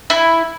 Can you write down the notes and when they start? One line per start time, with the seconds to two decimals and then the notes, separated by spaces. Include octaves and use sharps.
0.10 E4